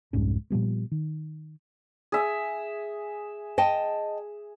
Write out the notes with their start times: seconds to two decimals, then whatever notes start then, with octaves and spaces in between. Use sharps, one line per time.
0.13 C2 F2 G#2 C#4
0.50 A#2 F3 G3 B3
0.91 D#3
2.12 G#4 E5
3.58 D#5 G5 A5